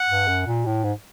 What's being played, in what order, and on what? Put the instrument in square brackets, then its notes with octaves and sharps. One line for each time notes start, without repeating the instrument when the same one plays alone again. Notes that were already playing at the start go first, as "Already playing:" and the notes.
Already playing: [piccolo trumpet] F#5
[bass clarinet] G2
F#2
A#2
A2
G#2